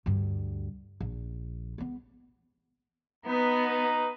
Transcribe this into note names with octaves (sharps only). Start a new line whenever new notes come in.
D2 G2
A#1
G#3 B3
B3 D#4 B4 A#5